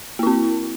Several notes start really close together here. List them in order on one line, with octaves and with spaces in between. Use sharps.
A#3 E4 C4